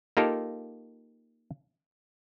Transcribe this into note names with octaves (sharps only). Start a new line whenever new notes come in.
A#3 D#4 F4 G4 A4 A#4